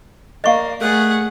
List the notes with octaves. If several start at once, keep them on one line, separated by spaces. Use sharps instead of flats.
A#3 D5 D#5 F5 C#6
A3 G#4 A#4 D5 F#5